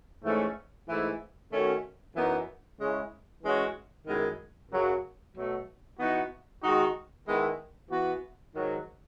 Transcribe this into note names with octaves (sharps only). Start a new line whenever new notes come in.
G#2 E3 A3 C#4
G#2 E3 A3 E4
D#3 A3 C#4 F#4
F#2 E3 B3 D#4
C#3 G#3 C#4 E4
E3 G#3 C#4 F#4
F#2 D#3 G#3 B3 E4
F#2 C#3 F#3
B2 F#3 A3
E3 B3 D#4 F#4
D#3 G#3 D#4 F#4
D#3 G#3 B3 E4
E3 B3 F#4
G#2 D#3 F#3